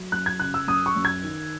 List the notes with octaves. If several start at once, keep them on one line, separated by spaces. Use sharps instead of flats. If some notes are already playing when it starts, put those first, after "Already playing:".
Already playing: F#3
F#2 F#6
G#6
C#3 F#6
E6
F#2 D#6
C#6
F#2
G#6
D#3